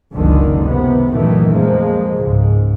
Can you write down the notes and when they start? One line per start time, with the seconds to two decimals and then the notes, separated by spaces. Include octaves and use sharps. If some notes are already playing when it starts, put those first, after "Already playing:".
0.12 F#1 C#2 D3 D#3
0.62 C3 B3
1.08 F#2 A#2 D#3 E3 A3
1.52 F2 F3 G#3 A#3
2.14 C#2 G#2